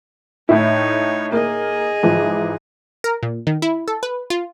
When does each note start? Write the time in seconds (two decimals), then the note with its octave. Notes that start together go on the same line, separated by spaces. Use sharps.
0.49 A2 D#4 E4 C#5
1.32 A#3 G#4 D#5
2.03 G#2 E3 F3
3.04 A#4
3.23 A#2
3.47 D#3
3.62 E4
3.88 A4
4.03 B4
4.30 F4